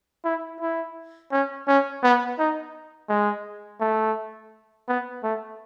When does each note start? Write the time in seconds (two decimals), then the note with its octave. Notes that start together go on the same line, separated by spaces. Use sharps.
0.24 E4
0.61 E4
1.32 C#4
1.67 C#4
2.03 B3
2.39 D#4
3.09 G#3
3.80 A3
4.88 B3
5.23 A3